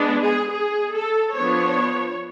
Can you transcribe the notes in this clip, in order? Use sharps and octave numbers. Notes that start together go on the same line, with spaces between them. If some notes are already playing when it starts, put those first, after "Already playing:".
Already playing: G#3 B3 D4
G#4
G#4
A4
F3 B3 D4 C#5